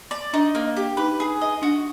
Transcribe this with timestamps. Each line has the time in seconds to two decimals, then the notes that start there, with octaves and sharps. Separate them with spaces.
0.11 D5
0.33 D4 D#4
0.55 A#3
0.77 G4
0.97 D#4 B4
1.20 G#4
1.41 D#5
1.62 D4 F#4